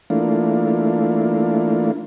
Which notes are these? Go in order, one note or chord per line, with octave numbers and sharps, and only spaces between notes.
E3 A3 A#3 D4 F4